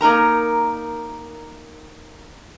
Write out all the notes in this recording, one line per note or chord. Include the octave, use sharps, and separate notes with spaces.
A#3 D#4 A#4 A#5